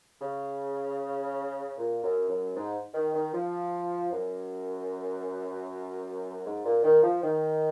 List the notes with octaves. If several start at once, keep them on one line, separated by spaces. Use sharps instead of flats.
C#3
A#2
F#2
F#2
G#2
D#3
D#3
F3
F#2
G#2
A#2
D#3
F3
D#3